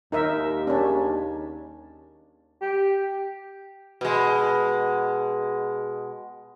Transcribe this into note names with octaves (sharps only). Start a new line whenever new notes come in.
D#2 D#4 A#4 E5
C#4 D4
G4
B2 G#3